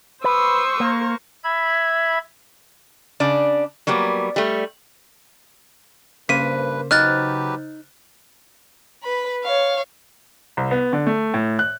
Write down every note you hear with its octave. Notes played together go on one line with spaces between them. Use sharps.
B4 C5 C6 C#6 D#6 E6
A#3 A#4
E5 B5 G#6
C#3 D4 D5
F#3 G3 A#3 B3
G3 A3
G2 C#3 A#3 B4 C5 B6 D#7
F#3 D#4 G4 B4 F6 F#6 A6
B4 B5
C#5 F5
C2
B3
D3
A3
A2
F#6